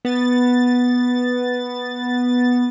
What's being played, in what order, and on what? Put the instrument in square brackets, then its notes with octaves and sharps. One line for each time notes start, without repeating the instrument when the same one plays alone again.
[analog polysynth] B3 A6